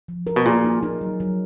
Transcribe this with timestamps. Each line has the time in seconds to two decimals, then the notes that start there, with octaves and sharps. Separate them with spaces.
0.08 F3
0.27 A#4
0.36 B2
0.46 A#2 G#4
0.65 D#4
0.83 D#4
1.01 F#3
1.20 F#3